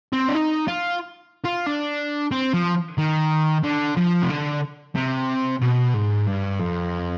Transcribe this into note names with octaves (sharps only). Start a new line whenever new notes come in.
C4
D4
D#4
F4
F4
D4
C4
F3
D#3
D3
F3
C3
D3
C3
B2
G#2
G2
F2